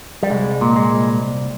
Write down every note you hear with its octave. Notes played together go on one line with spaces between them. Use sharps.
G3
C2 G#3
A#2
G#3
C2